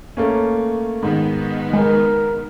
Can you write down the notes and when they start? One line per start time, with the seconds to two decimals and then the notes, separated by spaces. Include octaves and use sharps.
0.17 A3 A#3 C#4
1.03 G#2 D#3 B3
1.73 G#3 A#4